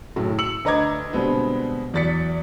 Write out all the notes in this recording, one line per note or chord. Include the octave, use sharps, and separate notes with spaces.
F#1 A2 F#3
E6 C#7 F#7
D2 B4 D#5 A#5 D6 G#6
B2 D3 G3 G#3 B3 C4
E2 F#3 D5 A6 B6 C#7